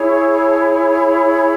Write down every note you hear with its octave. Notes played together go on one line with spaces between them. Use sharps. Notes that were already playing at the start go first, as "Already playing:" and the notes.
Already playing: E4 G#4 C#5
C#6
B5
A5
B5